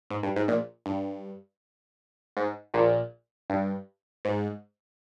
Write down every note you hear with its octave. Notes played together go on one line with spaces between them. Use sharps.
G#2
G2
G#2
A#1 A#2
G2
G#2
A#1 A#2
G2
G#2